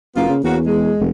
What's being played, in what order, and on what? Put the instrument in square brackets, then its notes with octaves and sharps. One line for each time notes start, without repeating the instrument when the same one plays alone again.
[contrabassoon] F#1 [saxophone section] A#3 B3 F4
[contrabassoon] C#3
[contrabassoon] E2 [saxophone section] A#3 C#4 F#4
[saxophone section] G#3
[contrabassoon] F1